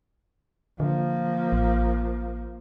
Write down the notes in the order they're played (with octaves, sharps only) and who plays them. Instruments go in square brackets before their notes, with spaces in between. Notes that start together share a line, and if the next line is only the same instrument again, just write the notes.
[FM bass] D3 [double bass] F3 A#3
[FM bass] A1